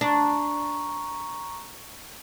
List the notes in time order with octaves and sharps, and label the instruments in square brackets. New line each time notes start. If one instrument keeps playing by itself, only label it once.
[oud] D4 [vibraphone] A#5 C#6